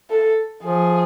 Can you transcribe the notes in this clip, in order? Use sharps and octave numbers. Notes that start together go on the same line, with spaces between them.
A4
F3 G#4